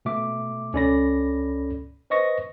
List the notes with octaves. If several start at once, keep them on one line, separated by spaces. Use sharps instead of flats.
B2 A3 E5 D6
C#2 C#4 A4 D5 B5 A#6
B4 C5 D#5 C#6 A#6